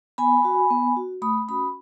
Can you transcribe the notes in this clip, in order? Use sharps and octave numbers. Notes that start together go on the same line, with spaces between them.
B3 G#5 B5
F#4
B3
F#4
A3 B5 D#6
C#4 F#4 B5 D#6